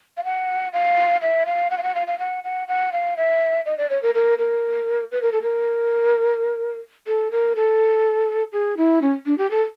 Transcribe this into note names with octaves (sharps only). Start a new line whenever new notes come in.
F5
F#5
F5
E5
F5
F#5
F5
F#5
F5
F5
F#5
F#5
F#5
F5
E5
D#5
D5
C#5
A#4
A#4
A#4
B4
A#4
A4
A#4
A4
A#4
A4
G#4
E4
C#4
D4
G4
A4